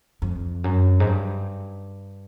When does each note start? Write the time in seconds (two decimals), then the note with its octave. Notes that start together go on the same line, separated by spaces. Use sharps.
0.22 F2
0.64 F#2
1.00 G#2
1.07 G2